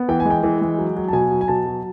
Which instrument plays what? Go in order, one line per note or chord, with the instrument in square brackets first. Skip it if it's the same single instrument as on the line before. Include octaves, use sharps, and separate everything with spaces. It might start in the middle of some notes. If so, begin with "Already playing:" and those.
Already playing: [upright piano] B3
E3 G5
G#5
G#3 G5
E3
G#3
F#3
F#3
A5
B2 G#5
F#3
G#5
B2 A5
F#3